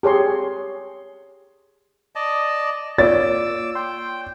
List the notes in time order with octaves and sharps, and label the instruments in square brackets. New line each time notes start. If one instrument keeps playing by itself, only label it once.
[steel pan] G4 G#4 C#5 C6
[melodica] D5 D#5 A5
[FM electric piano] A#3 F4 [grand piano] C#5 D5 A6 [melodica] D6 E6
[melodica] G5 [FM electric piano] C6